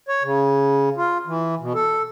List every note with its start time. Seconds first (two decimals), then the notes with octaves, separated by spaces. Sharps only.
0.09 C#5
0.23 C#3
0.97 F4
1.27 E3
1.60 B2
1.75 A4